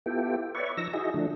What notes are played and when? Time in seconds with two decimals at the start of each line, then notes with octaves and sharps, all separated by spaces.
0.06 B3 E4 F4 G4 A4 G5
0.55 B4 C#5 D5 E5 C#6
0.77 F3 D#4 E6 A#6
0.94 D#4 E4 F#4 G#4 D#5
1.14 D3 F3 A3 D4